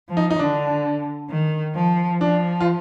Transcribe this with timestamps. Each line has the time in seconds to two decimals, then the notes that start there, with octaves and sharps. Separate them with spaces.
0.09 F3
0.17 D#4
0.30 D#4
0.39 D3 D4
1.30 D#3
1.75 F3
2.21 F3 D4
2.60 F4